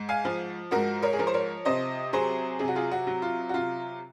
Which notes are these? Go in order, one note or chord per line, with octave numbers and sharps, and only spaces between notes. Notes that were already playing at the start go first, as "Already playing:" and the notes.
Already playing: G#2
F5 G#5
F3
G#2 F#4 A#4
A#4 C#5
G#4
F3 A#4
C5
A#4 C#5
C3 C5 D#5
F#3 G#4 C5
C3 G#4
F#4
F4 G#4
F#4
F#3
F4
F#4
C3 F4